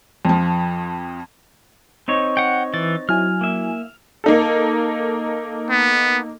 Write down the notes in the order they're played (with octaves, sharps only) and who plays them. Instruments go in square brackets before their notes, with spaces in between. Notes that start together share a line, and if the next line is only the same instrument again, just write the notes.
[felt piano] F2 F3
[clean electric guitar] C4 D#4 C#5
[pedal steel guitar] F#5 G5
[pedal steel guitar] E3 [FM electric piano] A6
[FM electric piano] F#3 E4 G#5 [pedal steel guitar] F6
[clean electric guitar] A#3 E5
[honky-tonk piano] A#3 D#4 A4
[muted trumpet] B3